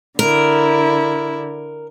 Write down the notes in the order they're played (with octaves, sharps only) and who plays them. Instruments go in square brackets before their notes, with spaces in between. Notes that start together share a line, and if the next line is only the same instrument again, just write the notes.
[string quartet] D3 E4 [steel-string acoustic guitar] A#4